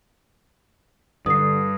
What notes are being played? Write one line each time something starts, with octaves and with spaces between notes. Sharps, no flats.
G2 D3 D#6 C7